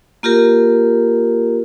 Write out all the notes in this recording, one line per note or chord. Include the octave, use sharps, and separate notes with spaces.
A#3 F4 G4 A#4